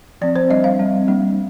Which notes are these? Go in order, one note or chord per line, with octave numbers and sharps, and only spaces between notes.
F3 C4 D5
C5
G3 D4 D#5
F5
G3 C4
G3 A#3 D4